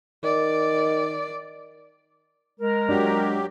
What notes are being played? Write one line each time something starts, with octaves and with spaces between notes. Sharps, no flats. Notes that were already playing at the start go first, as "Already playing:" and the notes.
D#3 D5
G#3 A#4
F#3 D4 F#4 G4